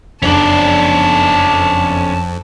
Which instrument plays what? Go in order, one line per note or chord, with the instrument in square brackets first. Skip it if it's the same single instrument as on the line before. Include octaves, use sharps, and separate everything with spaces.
[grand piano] F#1 D4 F#7 [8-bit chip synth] F2 [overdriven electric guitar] C#4 D5 [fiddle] A5